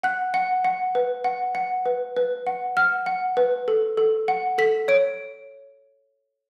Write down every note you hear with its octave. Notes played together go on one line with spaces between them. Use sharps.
F#5 F#6
F#5
F#5
B4
F#5
F#5
B4
B4
F#5
F#5 F6
F#5
B4
A4
A4
F#5
A4 B6
C#5 D7